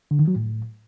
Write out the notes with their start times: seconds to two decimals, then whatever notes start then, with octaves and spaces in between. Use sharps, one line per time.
0.11 D3
0.19 D#3
0.28 F#3
0.36 A2